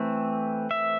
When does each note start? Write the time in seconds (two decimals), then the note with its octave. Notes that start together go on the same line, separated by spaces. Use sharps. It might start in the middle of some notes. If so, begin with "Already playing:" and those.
Already playing: E3 A3 C4
0.71 E5